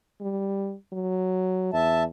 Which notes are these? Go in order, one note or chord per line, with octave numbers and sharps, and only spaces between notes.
G3
F#3
E2 E5 A5